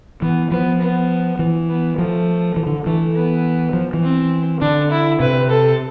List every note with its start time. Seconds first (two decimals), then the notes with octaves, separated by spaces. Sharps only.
0.22 E3 B3
0.51 F3 B3
0.81 B3
1.39 E3
1.69 B3
1.98 F3 A3
2.57 E3
2.66 D3
2.86 E3 A3
3.15 B3
3.73 F3
3.94 E3
4.03 C4
4.61 D3 D4
4.91 E4
5.20 C3 B4
5.50 A4